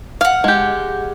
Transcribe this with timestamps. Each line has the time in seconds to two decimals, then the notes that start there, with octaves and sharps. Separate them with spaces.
0.21 F5 F#5 F6
0.44 G#3 G4